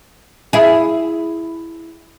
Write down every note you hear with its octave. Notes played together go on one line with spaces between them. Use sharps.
E4 G#4